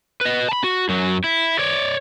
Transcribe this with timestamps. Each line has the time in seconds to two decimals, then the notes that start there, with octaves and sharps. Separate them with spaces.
0.21 B4 D#5
0.49 A5 B5
0.64 F#4
0.89 F#2 F#3
1.24 E4
1.59 C#5 D5